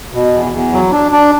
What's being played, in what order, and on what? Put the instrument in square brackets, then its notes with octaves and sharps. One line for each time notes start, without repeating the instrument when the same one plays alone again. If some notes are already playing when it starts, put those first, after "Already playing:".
[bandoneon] B2
E2
E2
F#3
D4
D4